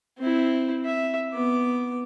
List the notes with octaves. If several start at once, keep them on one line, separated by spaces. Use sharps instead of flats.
C4 E4
E5
B3 D6